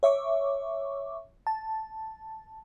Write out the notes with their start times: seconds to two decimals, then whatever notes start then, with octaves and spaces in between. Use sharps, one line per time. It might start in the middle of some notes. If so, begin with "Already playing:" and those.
0.03 C#5 E5 C#6 D6
1.47 A5